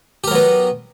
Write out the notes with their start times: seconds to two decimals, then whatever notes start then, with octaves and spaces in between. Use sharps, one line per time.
0.24 G4
0.27 A#4
0.31 F#3
0.35 B3